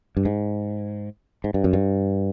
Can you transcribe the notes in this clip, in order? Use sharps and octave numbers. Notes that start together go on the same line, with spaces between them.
G2
G#2
G#2
G2
F#2
G2